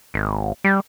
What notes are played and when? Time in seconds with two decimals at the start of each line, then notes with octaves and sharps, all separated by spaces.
0.14 G#1
0.64 G3